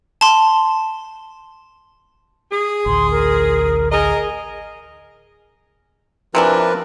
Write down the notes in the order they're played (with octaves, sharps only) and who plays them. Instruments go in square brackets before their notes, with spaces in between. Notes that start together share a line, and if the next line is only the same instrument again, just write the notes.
[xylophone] A5 C6
[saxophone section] G#4
[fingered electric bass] A1 D2 [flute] C6
[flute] A#4
[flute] G#4 [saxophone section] A#4 D#5
[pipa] C3 E3 D4 [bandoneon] F3 A#4 B4